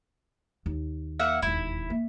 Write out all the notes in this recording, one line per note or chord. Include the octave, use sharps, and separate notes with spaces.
D#2
A#3 E5 F#5
E1 D#2 E4
A#3